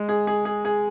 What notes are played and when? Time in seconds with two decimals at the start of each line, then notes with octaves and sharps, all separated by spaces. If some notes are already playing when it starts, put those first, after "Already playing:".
Already playing: G#3
0.09 G#4
0.27 G#4
0.45 G#4
0.65 G#4